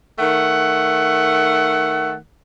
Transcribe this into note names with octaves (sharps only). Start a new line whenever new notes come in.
D#3 A3 F#5